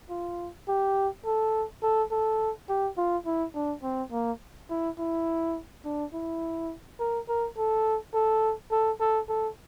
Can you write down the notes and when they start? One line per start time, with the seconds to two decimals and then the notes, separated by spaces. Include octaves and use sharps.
0.10 F4
0.68 G4
1.25 A4
1.83 A4
2.11 A4
2.69 G4
2.97 F4
3.26 E4
3.55 D4
3.83 C4
4.12 A#3
4.70 E4
4.99 E4
5.85 D4
6.14 E4
7.00 A#4
7.29 A#4
7.58 A4
8.14 A4
8.72 A4
9.00 A4
9.29 A4